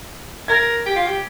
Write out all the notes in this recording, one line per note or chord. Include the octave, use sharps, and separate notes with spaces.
A#4 G#6
G4
F4
G4